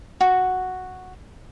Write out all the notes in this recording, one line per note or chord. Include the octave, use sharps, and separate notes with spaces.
F#4